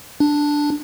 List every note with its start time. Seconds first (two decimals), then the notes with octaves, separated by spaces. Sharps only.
0.20 D4